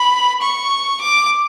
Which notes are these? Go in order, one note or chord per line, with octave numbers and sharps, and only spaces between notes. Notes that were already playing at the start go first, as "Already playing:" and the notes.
Already playing: B5
C#6
D6